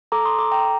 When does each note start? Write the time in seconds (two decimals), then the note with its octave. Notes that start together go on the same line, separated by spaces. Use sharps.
0.12 A4 A#5 D6
0.25 C6 D#6
0.39 A4 A#5 D6
0.51 G5 A#5